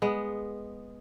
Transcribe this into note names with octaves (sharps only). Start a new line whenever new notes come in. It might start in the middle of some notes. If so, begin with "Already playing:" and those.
G#3 B3